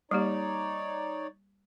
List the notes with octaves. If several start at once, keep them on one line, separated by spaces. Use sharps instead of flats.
G3 A#3 D#4 G4 C#5 D5